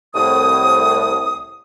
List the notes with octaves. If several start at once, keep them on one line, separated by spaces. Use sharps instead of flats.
C2 A2 D#6